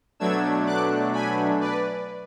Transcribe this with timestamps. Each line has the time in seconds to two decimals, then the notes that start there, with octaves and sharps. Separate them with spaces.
0.20 B2 F#3 A3 D4 E6 G#6
0.66 D6 F#6
1.13 G#5 B5
1.61 B4 D5